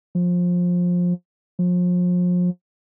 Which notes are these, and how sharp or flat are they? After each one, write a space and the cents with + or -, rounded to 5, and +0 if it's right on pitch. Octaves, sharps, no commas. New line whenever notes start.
F3 +20
F3 +35